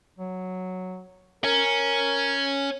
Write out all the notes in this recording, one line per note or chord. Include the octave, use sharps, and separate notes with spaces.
F#3
C#4 A#4